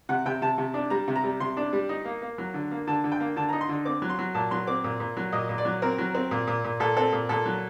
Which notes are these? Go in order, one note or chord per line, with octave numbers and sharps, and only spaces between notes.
C3 F#5
C3 G5
C3 A5
C3
D4
G3 A#5
C3
A#5
G3
C3 C6
D4
G3
D#4
A#3
A#3
F#3
D3
A#3
D3 A5
D3
G5
A#3
D3 A5
D#4 A#5
C6
D3
C4 D6
F#3
C6
F#3
A#2 A5
F#3 C6
C4 D6
A#2
A#2
F#3
A#2 D#5
A#2
D5
F#3
C4 A#4
F#3
C4
A#2
A#2
A#2
A#2 A4
C4 A4
A#2
A#2 A4
F#3